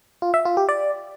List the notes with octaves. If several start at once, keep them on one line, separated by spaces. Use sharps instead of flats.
F4
E5
F4
G4
D5